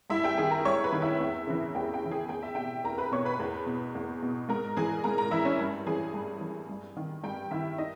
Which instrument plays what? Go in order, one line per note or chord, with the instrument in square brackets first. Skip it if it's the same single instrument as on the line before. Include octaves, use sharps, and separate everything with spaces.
[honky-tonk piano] G2 E4 E5
G4 G5
D#3 G#4 G#5
A#4 A#5
G2 C#5 C#6
B4 B5
D#3
E4 E5
E2
C#3 E3
E2 G4 G5
G4 G5
C#3 E3
G#4 G#5
E2 G5
E5
B2 G4 G5
E2 A#4 A#5
B4 B5
B2 C#5 C#6
B4 B5
E2
B2
E2
B2
G#2 A#4 A#5
E3 G#4 G#5
G#2 A#4 A#5
A#4 A#5
E3 E4 E5
C#4 C#5
G2
E3 G#4 G#5
G2
E3
G2
D#3
G2 G4 G5
D#3 E4 E5
D#4 D#5